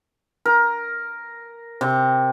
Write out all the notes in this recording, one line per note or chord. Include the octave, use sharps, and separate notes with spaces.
A#4
C3